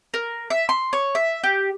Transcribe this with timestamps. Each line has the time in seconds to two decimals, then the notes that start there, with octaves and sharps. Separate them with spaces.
0.14 A#4
0.50 E5
0.69 C6
0.93 C#5
1.15 E5
1.44 G4